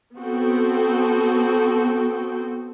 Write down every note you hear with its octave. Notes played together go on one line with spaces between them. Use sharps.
B3 C4 F#4 A4 G5